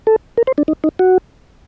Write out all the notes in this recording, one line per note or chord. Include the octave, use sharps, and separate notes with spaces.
A4
A#4
C5
D4
D#4
D#4
F#4